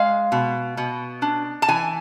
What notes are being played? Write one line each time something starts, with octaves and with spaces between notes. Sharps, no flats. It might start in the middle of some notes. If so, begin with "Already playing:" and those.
Already playing: G#3 F5
B2
B2
D4
A5
E3 G#5